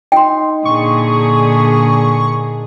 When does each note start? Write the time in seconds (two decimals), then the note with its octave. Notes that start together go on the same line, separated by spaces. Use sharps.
0.12 D#4 G5 C6
0.65 A#2 D3 G#4 C#6